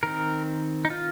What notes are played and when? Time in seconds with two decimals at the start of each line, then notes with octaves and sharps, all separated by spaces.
0.03 D#3 C4 A#4
0.85 D#4
0.90 F4